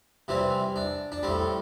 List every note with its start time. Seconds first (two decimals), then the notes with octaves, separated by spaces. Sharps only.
0.28 C3 E3 G3 C4
0.76 D4
1.12 D4
1.23 A2 G3 C4